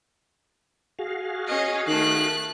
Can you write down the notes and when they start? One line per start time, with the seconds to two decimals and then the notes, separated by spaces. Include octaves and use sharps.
0.99 F#4 G#4 F5
1.47 C#4 D#5
1.87 D#3 A3 F#6